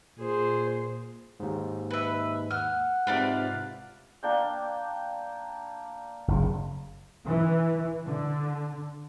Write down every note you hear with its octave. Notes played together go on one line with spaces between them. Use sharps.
A#2 G#4 C5
D#2 G#2
B4 E5
F#5 F6
G#2 C3 F4 B4 D5 F5
A#3 D4 G5
F#1 C#3
E3
D3